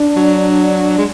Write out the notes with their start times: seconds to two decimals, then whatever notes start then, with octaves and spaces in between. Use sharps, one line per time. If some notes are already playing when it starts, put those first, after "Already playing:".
Already playing: D4
0.16 F#3
0.98 G#3